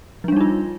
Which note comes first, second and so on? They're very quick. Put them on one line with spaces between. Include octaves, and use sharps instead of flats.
F3 D4 G3 D#4 F4